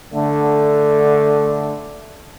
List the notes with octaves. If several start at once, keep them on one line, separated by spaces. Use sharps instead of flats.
D3 A3